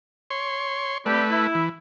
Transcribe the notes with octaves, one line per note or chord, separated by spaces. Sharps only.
C#5 C6
G3 A3 C4 G4 B4
E4
E3